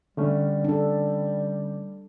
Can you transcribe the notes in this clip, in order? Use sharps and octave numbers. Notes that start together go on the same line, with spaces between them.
D3 G3 A3 C#4
D4 A4